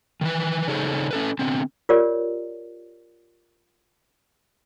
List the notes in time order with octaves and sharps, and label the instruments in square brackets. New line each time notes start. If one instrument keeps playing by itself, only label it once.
[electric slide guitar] D#3 E3 B4
C#3 D#4 G#4 A4 C5 C#5
C#4 A4 B4
D3 B3 C4
[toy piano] F4 G4 A#4 C#5 D5